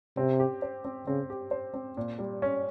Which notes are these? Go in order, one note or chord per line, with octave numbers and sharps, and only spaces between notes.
C3 C4
G4
C5
C4
C#3 C4
G4
C5
C4
A#2
G3
C#4